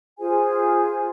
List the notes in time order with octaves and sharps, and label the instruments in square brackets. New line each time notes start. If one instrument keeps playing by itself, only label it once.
[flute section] F4 G#4 C5 G#5